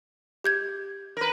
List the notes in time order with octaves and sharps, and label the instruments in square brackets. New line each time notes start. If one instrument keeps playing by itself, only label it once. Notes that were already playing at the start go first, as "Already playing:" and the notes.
[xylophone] G4 G6 G#6
[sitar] A#4 B4